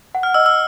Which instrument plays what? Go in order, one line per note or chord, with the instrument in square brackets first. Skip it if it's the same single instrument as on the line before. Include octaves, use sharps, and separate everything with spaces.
[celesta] F#5
[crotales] F6
[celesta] D#5 [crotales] E6
[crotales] E6